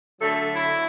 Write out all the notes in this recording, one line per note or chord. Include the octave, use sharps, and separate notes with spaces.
D3 F#3 A3 A4
E4